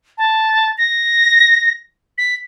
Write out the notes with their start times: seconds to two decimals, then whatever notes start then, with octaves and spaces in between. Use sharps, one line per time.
0.18 A5
0.78 A#6
2.18 B6